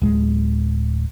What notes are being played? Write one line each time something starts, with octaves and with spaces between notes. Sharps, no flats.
D1 G#3